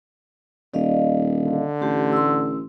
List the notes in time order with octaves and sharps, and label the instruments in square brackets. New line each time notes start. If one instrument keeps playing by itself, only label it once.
[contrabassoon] D#1 [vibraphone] D5 D#5 F5
[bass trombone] D3
[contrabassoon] A1 [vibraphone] A3 G4 C6
[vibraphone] C6 E6